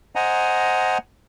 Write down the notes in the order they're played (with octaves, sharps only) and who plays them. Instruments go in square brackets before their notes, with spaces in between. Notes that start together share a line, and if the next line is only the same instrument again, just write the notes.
[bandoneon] C5 D#5 F#5 G#5 A#5